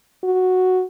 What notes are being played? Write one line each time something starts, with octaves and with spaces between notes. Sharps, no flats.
F#4